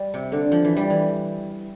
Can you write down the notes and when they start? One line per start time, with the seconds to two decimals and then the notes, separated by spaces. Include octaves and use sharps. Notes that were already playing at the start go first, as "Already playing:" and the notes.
Already playing: G3
0.14 C3
0.32 D3
0.52 F3
0.65 E3
0.77 G3
0.90 E3